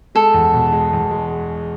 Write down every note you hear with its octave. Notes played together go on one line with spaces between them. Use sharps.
G#3 A4
E2
B2
G#3
E2
G#3